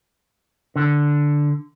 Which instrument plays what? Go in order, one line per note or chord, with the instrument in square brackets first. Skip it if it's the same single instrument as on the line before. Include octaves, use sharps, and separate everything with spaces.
[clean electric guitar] D3